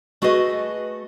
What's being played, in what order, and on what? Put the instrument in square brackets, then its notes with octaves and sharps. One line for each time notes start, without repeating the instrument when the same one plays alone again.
[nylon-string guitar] A3 F#4 G#4 B4 D#5